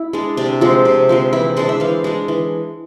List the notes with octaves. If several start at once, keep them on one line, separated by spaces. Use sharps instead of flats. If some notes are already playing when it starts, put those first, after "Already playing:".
Already playing: E4
G#3 D4
C3 D4
F3 G#3 C4
C3
F3 G#3 C4
E3 E4
G#3 D4 C5
E5
E3 F5
G#3 D4
E3